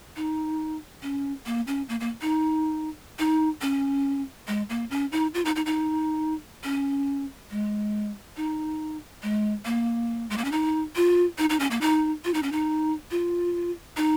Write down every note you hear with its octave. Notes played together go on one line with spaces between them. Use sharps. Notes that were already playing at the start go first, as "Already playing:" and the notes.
D#4
C#4
A#3
C#4
A#3
A#3
D#4
D#4
C#4
G#3
A#3
C#4
D#4
F4
D#4
D#4
D#4
C#4
G#3
D#4
G#3
A#3
G#3
A#3
C#4
D#4
F4
D#4
D#4
C#4
A#3
D#4
F4
D#4
C#4
D#4
F4
D#4